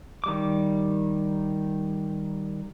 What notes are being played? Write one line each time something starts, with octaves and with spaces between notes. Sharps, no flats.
D#3 G3 D6